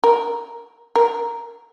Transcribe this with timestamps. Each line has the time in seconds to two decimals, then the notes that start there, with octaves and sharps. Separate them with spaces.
0.04 A#4
0.96 A#4